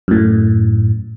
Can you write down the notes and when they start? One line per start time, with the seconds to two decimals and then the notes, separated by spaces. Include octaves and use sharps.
0.08 F#2 A2